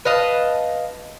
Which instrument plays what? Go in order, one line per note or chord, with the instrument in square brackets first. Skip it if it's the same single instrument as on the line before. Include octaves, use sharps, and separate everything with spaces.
[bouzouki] B4 D#5 F5 A5